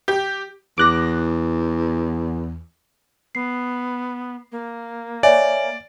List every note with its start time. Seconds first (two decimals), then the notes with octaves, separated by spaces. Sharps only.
0.08 G4
0.78 E2 D6 F#6 A#6
3.35 B3 C7
4.52 A#3
5.23 C#5 D5 E5 G#5